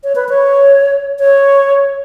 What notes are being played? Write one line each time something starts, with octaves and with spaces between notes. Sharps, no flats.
C#5
B4
C#5
C#5